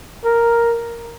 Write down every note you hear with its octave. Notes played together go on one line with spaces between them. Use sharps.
A#4